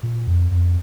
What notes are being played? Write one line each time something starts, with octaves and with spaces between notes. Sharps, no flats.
A#2
F2
F2